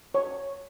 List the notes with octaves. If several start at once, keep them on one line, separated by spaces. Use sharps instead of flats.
C#5